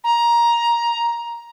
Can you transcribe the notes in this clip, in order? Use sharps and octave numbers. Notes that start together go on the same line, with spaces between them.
A#5